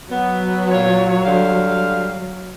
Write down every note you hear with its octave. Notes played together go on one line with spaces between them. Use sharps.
F#3 B3
A#2 F4 C#5
D3 G3 F5